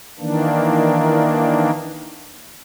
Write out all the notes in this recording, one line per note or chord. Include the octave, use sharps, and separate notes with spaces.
D#3 E3 A#3 D4